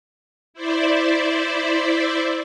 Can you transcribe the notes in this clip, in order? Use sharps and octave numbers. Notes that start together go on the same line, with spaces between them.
E4 C5 D5 E5